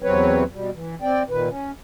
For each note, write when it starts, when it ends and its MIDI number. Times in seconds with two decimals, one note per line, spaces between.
0.03 0.44 40
0.03 0.44 48
0.03 0.44 54
0.03 0.44 60
0.03 0.44 71
0.03 0.44 73
0.52 0.70 47
0.52 0.70 55
0.73 0.95 52
1.02 1.23 60
1.02 1.23 74
1.02 1.23 79
1.30 1.49 46
1.30 1.49 51
1.30 1.49 71
1.49 1.71 61